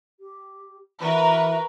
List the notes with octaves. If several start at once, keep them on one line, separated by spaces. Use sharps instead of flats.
G4
E3 F#4 A#4 B4